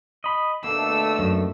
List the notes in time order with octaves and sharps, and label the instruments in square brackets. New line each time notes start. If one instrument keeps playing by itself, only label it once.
[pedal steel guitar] D#5 B5
[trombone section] B2 D3 A3 [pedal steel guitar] A#3 [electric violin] E6
[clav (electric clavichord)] F#2